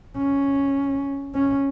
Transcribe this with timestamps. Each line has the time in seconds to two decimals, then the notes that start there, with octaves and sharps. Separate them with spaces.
0.18 C#4
1.35 C#4